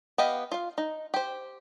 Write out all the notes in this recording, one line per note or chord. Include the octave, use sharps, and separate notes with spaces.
B3 G4 D#5 F5
F4 F5
D#4
G4 C5